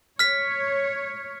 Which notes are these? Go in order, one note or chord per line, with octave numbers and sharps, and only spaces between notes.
C#5 F6 B6